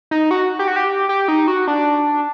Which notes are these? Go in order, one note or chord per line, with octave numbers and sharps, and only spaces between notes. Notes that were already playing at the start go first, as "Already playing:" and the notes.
D#4
F#4
G4
F#4
G4
G4
D#4
F#4
D4